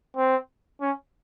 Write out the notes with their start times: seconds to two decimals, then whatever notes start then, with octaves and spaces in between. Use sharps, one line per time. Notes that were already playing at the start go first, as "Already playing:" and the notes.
0.17 C4
0.81 C#4